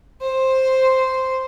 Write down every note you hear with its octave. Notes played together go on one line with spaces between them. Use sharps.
C5